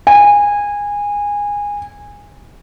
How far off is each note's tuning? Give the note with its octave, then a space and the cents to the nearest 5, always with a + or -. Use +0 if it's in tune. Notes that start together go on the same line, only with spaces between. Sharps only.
G#5 -20